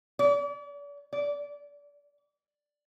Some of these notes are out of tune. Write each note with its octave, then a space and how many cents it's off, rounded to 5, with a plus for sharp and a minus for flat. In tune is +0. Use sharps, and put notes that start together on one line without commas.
D5 -40
D5 -25